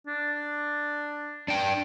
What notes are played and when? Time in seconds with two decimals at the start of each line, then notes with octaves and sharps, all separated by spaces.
0.07 D4
1.48 D4 G5